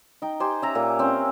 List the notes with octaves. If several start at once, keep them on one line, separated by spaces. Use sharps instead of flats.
D#4 G5
G4 C5 G#5
C#4 E5 A#5
A#2
C4 C#4